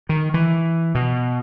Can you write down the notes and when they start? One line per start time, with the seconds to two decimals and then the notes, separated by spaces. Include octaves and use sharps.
0.09 D#3
0.34 E3
0.95 B2